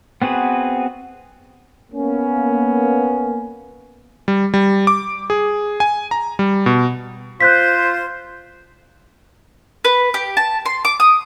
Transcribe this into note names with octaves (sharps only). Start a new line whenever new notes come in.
B3 C4 F#4 G#4 B4
A#3 B3 C#4
G3
G3
D6
G#4
G#5
A#5
G3
B2
F4 C5 F#6 G6 B6
B4
G4
A5
C6
D6
D#6